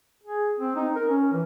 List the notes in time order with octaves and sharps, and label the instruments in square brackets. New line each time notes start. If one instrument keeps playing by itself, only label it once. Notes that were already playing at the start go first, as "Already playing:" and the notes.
[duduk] G#4
C4
D#4
A#4
C#4
E3